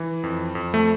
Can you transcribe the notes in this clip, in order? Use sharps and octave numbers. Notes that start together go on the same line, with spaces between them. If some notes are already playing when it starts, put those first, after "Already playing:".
Already playing: E3
F2
F2
A3